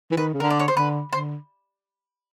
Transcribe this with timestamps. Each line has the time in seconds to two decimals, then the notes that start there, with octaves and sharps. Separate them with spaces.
0.11 E3
0.17 D#3 B4
0.34 C#3
0.40 D3 A#4
0.50 D5
0.60 C#5
0.68 C5
0.76 D3 B4
1.12 D3 C5